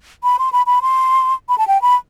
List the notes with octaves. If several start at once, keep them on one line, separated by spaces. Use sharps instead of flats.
B5
C6
B5
B5
C6
B5
A5
G5
B5